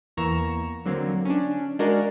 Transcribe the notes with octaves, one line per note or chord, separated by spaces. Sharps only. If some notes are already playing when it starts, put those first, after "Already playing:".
E2 E3 A#3 A#5 C#6 E7
D3 F#3 A#3 C4
C#4 D4
G#3 D4 F#4 A#4 D5 F5